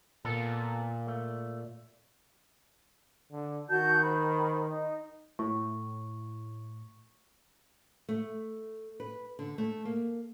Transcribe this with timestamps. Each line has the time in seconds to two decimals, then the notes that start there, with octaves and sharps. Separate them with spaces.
0.25 A#2 B3 F4 A4
1.07 A3
3.32 D3
3.69 D#3 F#4 A5 G6
4.02 C5 B5
4.65 D#4
5.39 A2 C#6
8.09 A3
9.00 B4
9.39 D3
9.58 A3
9.85 A#3